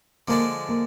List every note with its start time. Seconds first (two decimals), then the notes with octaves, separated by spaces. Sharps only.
0.28 D3 F3 G#3 A#3 D4
0.69 A#3